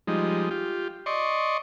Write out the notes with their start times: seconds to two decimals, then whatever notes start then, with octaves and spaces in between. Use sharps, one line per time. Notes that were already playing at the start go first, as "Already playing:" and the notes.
0.07 F3 G3 G#3 D#4
0.51 F4 G4
1.06 D5 D#5 C6 C#6